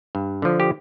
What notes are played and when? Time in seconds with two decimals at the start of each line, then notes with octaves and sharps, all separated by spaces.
0.15 G2
0.42 D3 F3
0.60 G4